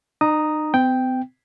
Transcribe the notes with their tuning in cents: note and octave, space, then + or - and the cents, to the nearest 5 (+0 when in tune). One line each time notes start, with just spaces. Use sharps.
D#4 -35 A#5 +0 D#6 +0
C4 -45 G5 +0